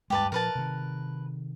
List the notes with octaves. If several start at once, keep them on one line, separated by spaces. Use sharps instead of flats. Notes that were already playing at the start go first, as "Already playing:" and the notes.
D2 G2 G#3 G4 B4 A5
A#2 F3 A#4 B4 A5
C3 D#3